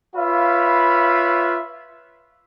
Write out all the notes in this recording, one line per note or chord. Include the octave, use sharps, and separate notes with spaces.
F4 B4 C#5 E5 F5 B5